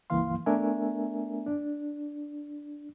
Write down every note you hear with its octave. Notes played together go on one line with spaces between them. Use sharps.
C#2 G2 E3 A#3 F5 C6
A3 B3 D4 A#4 E5 G#5
D4